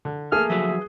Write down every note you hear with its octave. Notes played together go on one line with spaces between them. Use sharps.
D3
A3 A#3 G#4 F6
F3 F#3 B4 E5